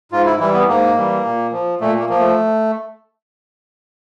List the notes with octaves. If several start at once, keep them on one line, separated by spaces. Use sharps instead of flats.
G#2 F4
E4
E3 G3 E4
B3
G#2 A#3
E3 G3
A#2
F3
A#2 A3
A#3
F3 A#3
A3